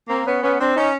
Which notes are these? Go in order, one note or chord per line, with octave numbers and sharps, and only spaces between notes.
A#3 C4
B3 C#4
B3 C#4
C4 D4
C#4 D#4